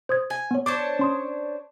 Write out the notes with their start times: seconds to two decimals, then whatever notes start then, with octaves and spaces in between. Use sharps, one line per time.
0.09 C5 D#6 G#6
0.30 G#5
0.51 B3 C#5
0.66 D4 C5 C#5 D6
0.99 C#4 C6 D#6